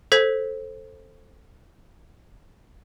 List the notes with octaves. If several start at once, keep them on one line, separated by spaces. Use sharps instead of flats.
A4 C5 G#6 B6